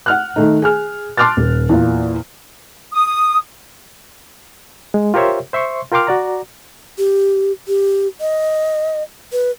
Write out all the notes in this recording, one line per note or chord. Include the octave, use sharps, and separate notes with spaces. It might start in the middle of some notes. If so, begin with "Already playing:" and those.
F#5 F6 F#6
D#3 A3 D#4
G#4 G#5 F6
A5 C6 D6 F6 F#6 A6
D#1
E2 A#2
D#6
G#3
F4 G4 A#4 C5 C#5 E5
C5 E5 C6 C#6
F4 A#4 G5 C6 D6 F6
F#4 D5 A#5
G4
G4
D#5
B4